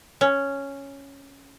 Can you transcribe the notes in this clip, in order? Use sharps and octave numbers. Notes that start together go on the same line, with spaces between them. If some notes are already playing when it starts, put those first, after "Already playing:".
C#4